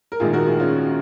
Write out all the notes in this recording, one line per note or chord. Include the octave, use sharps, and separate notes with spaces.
A#4
A#1 G#2 D#3 F4 G#4
F#4 A#4
F4 G#4
C#4 F4